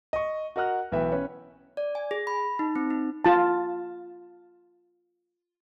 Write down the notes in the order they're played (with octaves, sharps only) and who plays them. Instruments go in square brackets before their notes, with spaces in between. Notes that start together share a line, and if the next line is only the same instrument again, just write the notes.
[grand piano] D#5 C#6
F#4 A#4 D#5 F#5 F6 F#6
B1 E3 B3 E5 G5
C#4 B4 C#5
[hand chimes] D5
G#5
G#4
B5
D#4
C4
D#4
[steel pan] F4 A5